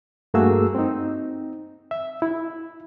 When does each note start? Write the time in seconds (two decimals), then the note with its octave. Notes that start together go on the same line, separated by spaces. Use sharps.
0.34 G2 A3 A#3 F#4 G#4 E6
0.75 C4 D#4
1.91 E5
2.22 E4